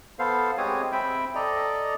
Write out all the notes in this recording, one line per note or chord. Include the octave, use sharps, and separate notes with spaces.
B3 A4 C5 F5
G#3 C4 G4 C#5 D#6
C4 E5 G5 B5
A4 D5 D#5 A#5